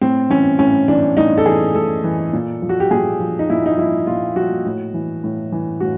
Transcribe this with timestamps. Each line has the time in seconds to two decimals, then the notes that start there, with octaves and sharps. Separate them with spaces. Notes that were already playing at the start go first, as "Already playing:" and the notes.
0.01 A2 C4
0.30 E3 C#4
0.59 A2 C#4
0.88 E3 D4
1.17 A2 D#4
1.38 A4
1.46 E3 G#4
1.75 A2 A4
2.04 E3
2.33 A#2
2.62 F3
2.69 F#4
2.80 G4
2.91 A#2 G#4
3.20 F3
3.39 D#4
3.49 A#2 E4
3.66 D#4
3.78 F3 E4
4.07 A#2 F4
4.36 F3 F#4
4.65 A2
4.94 E3
5.24 A2
5.52 E3
5.80 A2 F#4